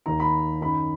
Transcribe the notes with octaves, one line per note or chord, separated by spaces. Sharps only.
D#2 D#3 A#5
B5
F#2 D#3 B5